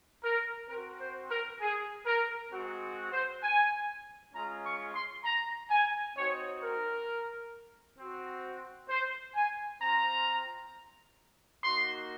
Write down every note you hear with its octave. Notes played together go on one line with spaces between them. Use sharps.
A#4
C4 F#4 A#4
C5
A#4
G#4
A#4
G#3 C4 F#4
C5
G#5
G#3 C#4 F4 A#5
C#6
C6
A#5
G#5
C4 D#4 F#4 C#5
A#4
C4 F#4
C5
G#5
C4 F4 A#5
A#3 D#4 F#4 C6